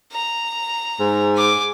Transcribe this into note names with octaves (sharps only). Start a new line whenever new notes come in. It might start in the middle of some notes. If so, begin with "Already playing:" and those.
A#5
G#2
G#5 D6